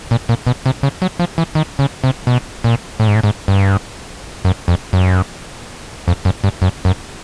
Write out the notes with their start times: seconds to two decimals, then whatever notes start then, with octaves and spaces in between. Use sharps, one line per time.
0.11 A#2
0.29 A#2
0.47 B2
0.66 C3
0.83 C#3
1.02 F#3
1.19 F3
1.38 E3
1.55 D#3
1.79 C#3
2.04 C3
2.27 B2
2.64 A#2
3.00 A2
3.07 G#2
3.15 A2
3.23 G#2
3.48 G2
4.45 F#2
4.68 F2
4.93 F#2
6.08 F2
6.25 F#2
6.44 G2
6.62 F#2
6.85 F#2